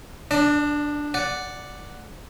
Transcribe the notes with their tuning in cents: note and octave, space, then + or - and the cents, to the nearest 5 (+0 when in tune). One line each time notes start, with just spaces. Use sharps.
D4 +0 D5 +35
D5 +0 F#5 +0